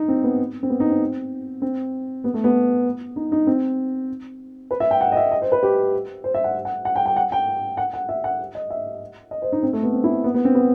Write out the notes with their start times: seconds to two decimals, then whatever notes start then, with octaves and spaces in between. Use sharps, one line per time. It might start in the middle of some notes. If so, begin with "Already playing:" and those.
Already playing: D#4
0.08 C4
0.24 B3
0.63 C4
0.70 B3
0.80 D#4
0.90 C4
1.62 C4
2.24 B3
2.34 A3
2.44 B3
3.16 D#4
3.32 D#4
3.47 C4
4.71 B4
4.80 E5
4.91 G5
5.01 F#5
5.12 D#5
5.17 E5
5.31 D#5
5.42 C5
5.52 B4
5.63 G4
6.24 C5
6.34 E5
6.44 F#5
6.65 F#5
6.85 F#5
6.95 G5
7.06 G5
7.16 F#5
7.32 G5
7.77 F#5
7.94 F#5
8.09 E5
8.24 F#5
8.55 D#5
8.70 E5
9.31 D#5
9.42 C5
9.52 D#4
9.63 C4
9.73 A3
9.83 B3
9.93 C4
10.04 E4
10.24 B3
10.34 B3
10.45 C4
10.55 B3